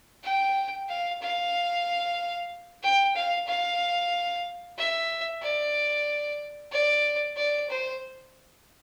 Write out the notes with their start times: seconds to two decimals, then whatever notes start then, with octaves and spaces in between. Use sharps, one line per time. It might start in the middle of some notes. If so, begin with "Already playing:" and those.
0.24 G5
0.89 F5
1.21 F5
2.83 G5
3.15 F5
3.47 F5
4.77 E5
5.42 D5
6.72 D5
7.36 D5
7.69 C5